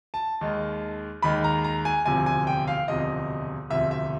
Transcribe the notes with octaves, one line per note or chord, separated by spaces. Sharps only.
A5
D#2 D#3 G#3
D#2 D#3 G#3 B5
A#5
A#5
G#5
E1 D2 C3 F3 G#5
G#5
G5
F5
E1 D2 C3 F3 D#5
E1 D2 C3 F3 E5
E5